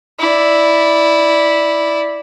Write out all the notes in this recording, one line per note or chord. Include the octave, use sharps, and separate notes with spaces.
E4 D5